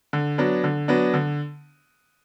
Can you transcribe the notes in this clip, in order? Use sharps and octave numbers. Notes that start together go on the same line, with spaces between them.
D3
F#3 B3 D4
D3
F#3 B3 D4
D3